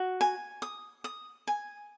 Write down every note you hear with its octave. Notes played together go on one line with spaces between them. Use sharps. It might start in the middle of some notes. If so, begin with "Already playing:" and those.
Already playing: F#4
G#5
D#6
D#6
G#5